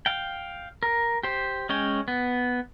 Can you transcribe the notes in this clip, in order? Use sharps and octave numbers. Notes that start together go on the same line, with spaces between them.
F5 G5
A#4
G4 C5
G#3 C#4 C#5 G5
B3